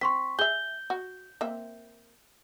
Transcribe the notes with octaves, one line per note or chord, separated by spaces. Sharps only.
C4 C6 C#6 B6
G#4 E5 G6 G7
F#4
A#3 C4 E5